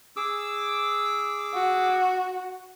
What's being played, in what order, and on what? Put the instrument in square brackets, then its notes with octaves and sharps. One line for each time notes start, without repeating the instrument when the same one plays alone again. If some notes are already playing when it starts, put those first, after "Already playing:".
[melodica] G#4 D6 E6
[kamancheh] F#4